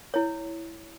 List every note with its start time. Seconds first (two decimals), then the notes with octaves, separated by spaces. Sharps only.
0.14 E4 C#5